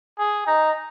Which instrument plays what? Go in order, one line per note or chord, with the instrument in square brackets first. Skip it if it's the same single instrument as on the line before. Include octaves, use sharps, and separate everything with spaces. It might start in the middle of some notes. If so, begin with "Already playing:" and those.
[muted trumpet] G#4
D#4